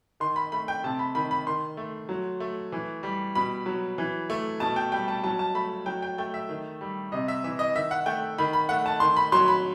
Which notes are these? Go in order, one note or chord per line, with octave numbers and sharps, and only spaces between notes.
D#3 C6
B5
A3 B5
G5
C3 A5
B5
D#3 B5
B5
D#3 C6
A3
F#3
A3
E3
G3
B2 B5
F#3
E3
A3
B2 A5
G5
G3 G5
A5
F#3 A5
A5
A3 B5
F#3 G5
G5
A3 G5
E5
D#3
G3
C3 D#5
E5
E3 E5
D#5
D#3 E5
F#5
A3 G5
D#3 B5
B5
A3 F#5
A5
D#3 C6
B5
F#3 C6
B5